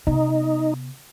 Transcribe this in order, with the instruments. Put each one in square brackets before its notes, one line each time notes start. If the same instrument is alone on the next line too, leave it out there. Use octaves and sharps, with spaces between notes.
[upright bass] C3 B3 [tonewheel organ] D#4